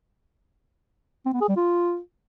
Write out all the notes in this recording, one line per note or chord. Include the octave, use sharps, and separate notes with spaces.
C4
B3
G#4
G3
F4